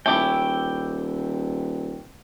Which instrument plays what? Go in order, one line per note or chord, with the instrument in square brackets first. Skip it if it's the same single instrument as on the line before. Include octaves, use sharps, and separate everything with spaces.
[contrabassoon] D#1 [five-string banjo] A3 C#4 E4 [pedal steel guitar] G5 D6